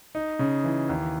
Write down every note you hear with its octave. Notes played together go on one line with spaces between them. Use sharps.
D#4
C#3
E3
D#2